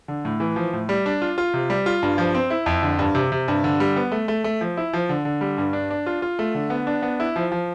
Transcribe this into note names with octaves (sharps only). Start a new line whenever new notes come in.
D3
A2
E3
F3
A2
G3
D4
F4
F4
C3
G3
F4
G2
F3
C4
E4
F2
D3
G2
C3
C3
G2
D3
G3
B3
A3
A3
A3
F3
E4
F3
D3
D3
G3
G2
D4
D4
F4
F4
A3
D3
B3
D4
B3
E4
F3
F3